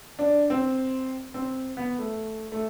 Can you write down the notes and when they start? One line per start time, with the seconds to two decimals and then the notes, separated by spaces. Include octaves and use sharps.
0.19 D4
0.50 C4
1.34 C4
1.77 B3
1.99 A3
2.52 A3